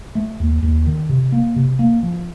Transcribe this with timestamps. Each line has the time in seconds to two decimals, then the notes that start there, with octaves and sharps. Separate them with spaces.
0.15 A3
0.40 D#2
0.63 D#2
0.87 D#3
1.09 C3
1.32 A#3
1.56 C3
1.79 A#3
2.03 F3